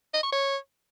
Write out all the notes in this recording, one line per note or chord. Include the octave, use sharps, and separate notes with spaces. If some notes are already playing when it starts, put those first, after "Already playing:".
D#5
C#6
C#5